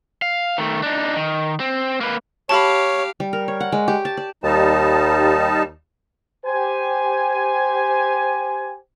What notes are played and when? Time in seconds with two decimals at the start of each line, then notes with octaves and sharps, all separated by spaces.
0.22 F5
0.58 D#3 A3
0.83 D4 D#4
1.16 D#3
1.60 C4
2.01 A#3 B4
2.49 G4 C#5 F5 A5 B5
3.20 G3
3.33 A#4
3.48 C#5
3.60 F#5
3.72 G#3
3.88 G4
4.05 A5
4.17 D5
4.44 D#2 G3 D#4 A5
6.46 G4 C5 G#5